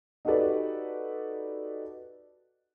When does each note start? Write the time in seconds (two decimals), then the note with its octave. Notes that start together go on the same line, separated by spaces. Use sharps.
0.25 D#4 F#4 G4 A4 B4 D5